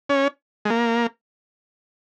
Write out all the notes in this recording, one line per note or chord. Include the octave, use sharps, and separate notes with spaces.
C#4
G#3
A#3